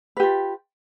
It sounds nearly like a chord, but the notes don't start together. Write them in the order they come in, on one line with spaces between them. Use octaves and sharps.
B4 G4 F4